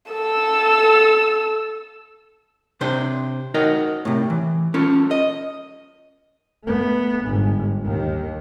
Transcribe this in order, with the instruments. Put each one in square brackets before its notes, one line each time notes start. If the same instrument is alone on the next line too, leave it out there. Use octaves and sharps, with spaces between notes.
[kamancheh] A4 E6
[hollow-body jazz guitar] C3 D4 C5
D#4 F#4 A#4 D#5
A2 C3
E3
C#4 F4 A4
D#5
[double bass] A3 B3
G1 G#2
D#2 D#3